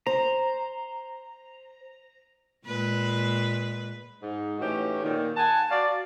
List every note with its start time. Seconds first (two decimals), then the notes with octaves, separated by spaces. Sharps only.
0.07 C5 A#5
2.66 A#2 G#3 B4
4.22 G#2 D#4
4.60 A2 E3 C#4 D#4 F#4 G4
5.03 A#2 D#3
5.37 F#5 G#5 A5
5.71 F#4 D5 F5